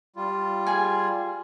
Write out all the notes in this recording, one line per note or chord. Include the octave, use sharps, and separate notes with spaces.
G3 F4
G#4 G#5